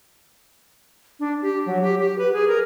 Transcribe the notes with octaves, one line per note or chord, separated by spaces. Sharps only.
D4
G4
F#3
G4
G4
B4
G#4
A#4